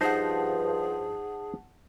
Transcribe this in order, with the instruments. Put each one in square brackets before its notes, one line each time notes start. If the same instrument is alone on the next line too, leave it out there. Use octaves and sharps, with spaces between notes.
[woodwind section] G2 F3 [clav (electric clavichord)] D#4 C5 [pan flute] G#4 [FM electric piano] F#5 A5